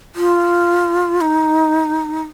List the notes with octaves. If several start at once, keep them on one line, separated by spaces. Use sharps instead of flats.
F4
D#4